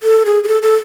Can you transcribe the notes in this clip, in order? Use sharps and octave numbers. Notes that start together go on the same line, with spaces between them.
A4
G#4
G#4
A4
A4